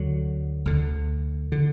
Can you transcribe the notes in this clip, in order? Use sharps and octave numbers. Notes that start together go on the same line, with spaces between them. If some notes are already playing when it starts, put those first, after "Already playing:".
Already playing: D2 D3 F#3
D2 D3
D3